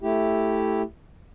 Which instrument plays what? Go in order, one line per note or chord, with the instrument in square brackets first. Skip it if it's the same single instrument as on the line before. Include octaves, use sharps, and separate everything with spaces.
[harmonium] A3 E4 G4